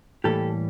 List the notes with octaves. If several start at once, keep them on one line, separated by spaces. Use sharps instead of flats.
A2 E3 G3 A#3 G4 A4